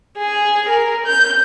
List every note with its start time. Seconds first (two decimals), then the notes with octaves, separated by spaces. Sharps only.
0.18 G#4
0.69 A#4
1.07 G6